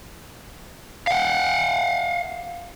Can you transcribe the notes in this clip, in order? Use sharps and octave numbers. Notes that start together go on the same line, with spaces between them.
F5 F#5